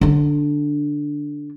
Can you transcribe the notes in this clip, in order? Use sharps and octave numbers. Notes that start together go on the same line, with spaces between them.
D3 D4